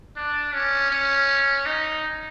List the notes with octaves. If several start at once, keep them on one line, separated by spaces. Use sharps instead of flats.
D4
C#4
C#4
D#4